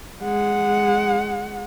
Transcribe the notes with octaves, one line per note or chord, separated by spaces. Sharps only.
G#3 F#5